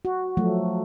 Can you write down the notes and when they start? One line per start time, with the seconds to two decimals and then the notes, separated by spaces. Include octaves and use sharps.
0.05 F#4
0.37 F3 F#3 A3